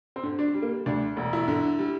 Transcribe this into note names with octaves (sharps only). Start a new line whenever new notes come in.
C4
D3
D4
G3
A#3
D2 D4
E1
E4
D3
G3